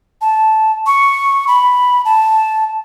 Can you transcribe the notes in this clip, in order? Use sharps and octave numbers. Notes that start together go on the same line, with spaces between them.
A5
C#6
B5
A5